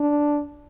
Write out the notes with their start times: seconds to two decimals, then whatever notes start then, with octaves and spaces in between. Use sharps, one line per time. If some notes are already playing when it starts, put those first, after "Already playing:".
Already playing: D4